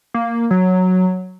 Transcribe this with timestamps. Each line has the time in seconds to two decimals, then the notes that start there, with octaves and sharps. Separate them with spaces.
0.14 A#3
0.51 F#3